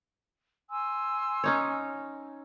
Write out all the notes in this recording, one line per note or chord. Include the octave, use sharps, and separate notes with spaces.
G#5 C6 E6
C#4 D#4 C#5